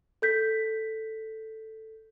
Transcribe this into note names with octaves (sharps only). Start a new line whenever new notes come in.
A4 G6 B6